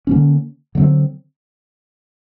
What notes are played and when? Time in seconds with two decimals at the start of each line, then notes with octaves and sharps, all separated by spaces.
0.07 D3 F3 A#3 C#4
0.75 D3 F#3 A3 C4